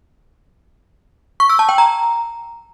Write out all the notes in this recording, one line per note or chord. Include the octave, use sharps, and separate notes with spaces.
C#6
E6
A5
G5
A#5